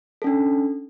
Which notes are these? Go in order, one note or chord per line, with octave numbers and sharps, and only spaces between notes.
C#4 D4 A4